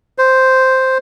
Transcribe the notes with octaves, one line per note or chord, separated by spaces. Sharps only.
C5